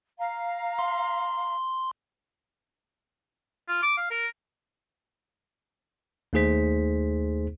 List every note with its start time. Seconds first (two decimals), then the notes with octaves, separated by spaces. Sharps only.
0.17 F5 A#5
0.79 C6
3.68 F4
3.82 D6
3.97 F5
4.11 A#4
6.33 D#2 A3 D#4 G#4 C5 B6